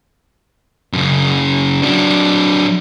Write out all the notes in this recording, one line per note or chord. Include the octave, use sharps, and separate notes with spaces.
F#2 C#3
F#3 D4